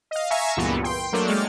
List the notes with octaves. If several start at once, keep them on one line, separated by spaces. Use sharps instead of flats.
D#5 F5
E5 F5 G#5 A#5 C#6 E6
C#2 G2 A#2 E3 B3
G5 C6
F#3 A3 A#3 D4
G#3 G5 F6 A6 C#7